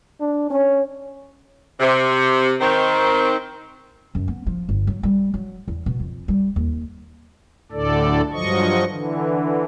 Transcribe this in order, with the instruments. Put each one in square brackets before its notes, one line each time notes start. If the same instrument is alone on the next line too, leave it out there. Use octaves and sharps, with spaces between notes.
[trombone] D4
[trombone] C#4 [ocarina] C#5
[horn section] C3
D#3 C4
[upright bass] F#2
B3
F3
G1
F#3
G3
F#3
E2
B2
F2
G3
D#2
[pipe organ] D2 A2 D3 A4 D5
G2 F3 F#3 D#5 C#6
D3 E3